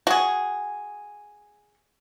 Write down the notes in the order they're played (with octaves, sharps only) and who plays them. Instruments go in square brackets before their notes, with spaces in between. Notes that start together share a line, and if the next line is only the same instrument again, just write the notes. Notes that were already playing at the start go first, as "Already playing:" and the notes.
[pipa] F#4 G#4